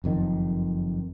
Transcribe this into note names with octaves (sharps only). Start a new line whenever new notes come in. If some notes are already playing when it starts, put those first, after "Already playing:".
F#1 F2 D#3